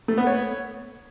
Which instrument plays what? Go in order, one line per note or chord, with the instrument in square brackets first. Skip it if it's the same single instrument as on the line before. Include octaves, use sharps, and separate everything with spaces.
[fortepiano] A3
B3
C#5